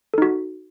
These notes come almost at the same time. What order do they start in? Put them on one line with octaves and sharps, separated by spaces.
A4 D#4 F#4